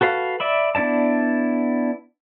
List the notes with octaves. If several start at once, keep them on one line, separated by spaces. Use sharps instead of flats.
F#4 A4 B4 F5
D5 E5 B5
B3 D4 E4 D5 A5